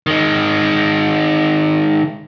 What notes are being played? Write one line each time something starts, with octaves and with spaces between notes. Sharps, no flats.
D#3 G#3